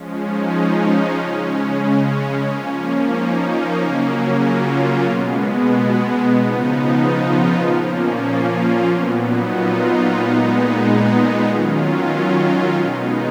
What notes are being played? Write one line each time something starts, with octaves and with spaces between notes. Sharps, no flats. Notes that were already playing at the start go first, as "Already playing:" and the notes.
Already playing: F3 G#3 C#4
D#4
C#3 G#3 C#4
F3 A#3 C#4
D#4
C#3 F#3 A#3 C#4
F4
B2 G#3 B3
C#3 F3 B3 D#4
F4
A#2 F3 A#3 C#4
F4
F4
A#2 F#3 B3
D#4
F4
A#2 G#3 B3 D#4
D#3 F#3 C#4 F4
B2 G#3 B3 D#4